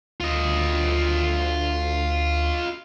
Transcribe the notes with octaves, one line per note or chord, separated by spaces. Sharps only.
D2 F4 D#5